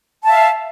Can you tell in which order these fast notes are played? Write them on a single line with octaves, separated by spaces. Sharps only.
A5 E5 F5